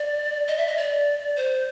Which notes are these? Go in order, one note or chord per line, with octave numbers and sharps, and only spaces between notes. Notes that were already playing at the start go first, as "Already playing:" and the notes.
Already playing: D5
D#5
E5
D#5
D5
C5